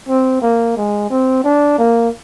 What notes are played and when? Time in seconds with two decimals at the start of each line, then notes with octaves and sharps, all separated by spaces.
0.09 C4
0.42 A#3
0.77 G#3
1.10 C4
1.44 D4
1.78 A#3